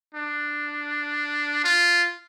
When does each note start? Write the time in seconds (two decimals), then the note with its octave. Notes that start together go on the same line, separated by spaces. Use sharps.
0.15 D4
1.64 F4